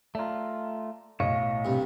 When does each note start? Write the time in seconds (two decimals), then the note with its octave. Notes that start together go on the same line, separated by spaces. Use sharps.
0.15 A3 F4 D5 A#5
1.20 B1 A2 C#5 D#5 F5
1.65 C2 G2